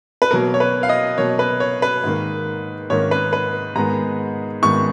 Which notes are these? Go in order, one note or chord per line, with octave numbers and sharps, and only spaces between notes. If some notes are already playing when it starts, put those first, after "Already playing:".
B4
B2 F#3 A#3 A#4
C#5
B4
F5
D#5
B2 F#3 A#3 C#5
B4
C#5
B4
G#2 D#3 A#3
G#2 D#3 A#3 C#5
B4
B4
G#2 D#3 G#3 B3 A#5
G#2 D#3 G#3 B3 C#6